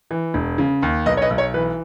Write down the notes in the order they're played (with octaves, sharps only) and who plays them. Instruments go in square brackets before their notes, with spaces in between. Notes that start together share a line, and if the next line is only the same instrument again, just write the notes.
[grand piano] E3
E1
C#3
D#2
B1 B4 D#5
C#5
B4 D#5
B1
C#5
E3 B4